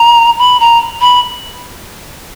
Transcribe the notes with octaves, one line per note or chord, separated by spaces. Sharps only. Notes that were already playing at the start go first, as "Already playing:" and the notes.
Already playing: A#5
B5
A#5
B5